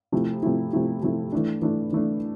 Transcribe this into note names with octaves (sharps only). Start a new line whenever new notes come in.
C3 F3 A3 E4
C3 F3 A3 E4
C3 F3 A3 E4
C3 F3 A3 E4
E3 A3 D4
E3 A3 D4
E3 A3 D4